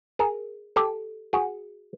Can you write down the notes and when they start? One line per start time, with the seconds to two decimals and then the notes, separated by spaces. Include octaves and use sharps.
0.19 G#4 A#4
0.76 G4 A4
1.33 F#4 G#4